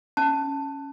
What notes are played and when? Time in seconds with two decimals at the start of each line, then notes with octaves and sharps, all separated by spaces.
0.17 C#4 A5